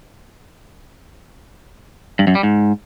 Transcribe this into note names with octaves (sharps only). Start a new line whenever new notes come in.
G2
F#2
G3
G#2